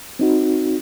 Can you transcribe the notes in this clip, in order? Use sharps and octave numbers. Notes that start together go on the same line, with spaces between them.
C4 D#4 F#4